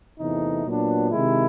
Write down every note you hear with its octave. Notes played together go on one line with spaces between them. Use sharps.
E2 C3 E3 A3 D#4
A#2 F#3 B3 D4
C3 D#3 G#3 E4